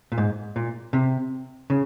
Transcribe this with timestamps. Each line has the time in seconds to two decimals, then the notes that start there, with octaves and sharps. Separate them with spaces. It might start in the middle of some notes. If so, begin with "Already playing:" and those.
0.12 A#2
0.18 G#2
0.56 A#2
0.93 C3
1.70 C#3